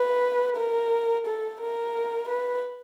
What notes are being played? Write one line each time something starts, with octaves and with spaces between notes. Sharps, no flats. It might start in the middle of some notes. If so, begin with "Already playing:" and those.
Already playing: B4
A#4
A4
A#4
B4